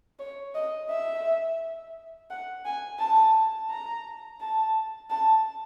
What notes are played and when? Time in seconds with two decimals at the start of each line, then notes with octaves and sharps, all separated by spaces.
0.19 C#5
0.55 D#5
0.90 E5
2.30 F#5
2.66 G#5
3.00 A5
3.70 A#5
4.41 A5
5.10 A5